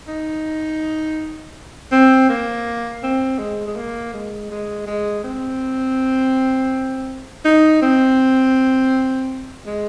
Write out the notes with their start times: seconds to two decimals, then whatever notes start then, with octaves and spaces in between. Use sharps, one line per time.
0.08 D#4
1.92 C4
2.29 A#3
3.03 C4
3.39 G#3
3.68 G#3
3.76 A#3
4.14 G#3
4.50 G#3
4.86 G#3
5.24 C4
7.45 D#4
7.82 C4
9.66 G#3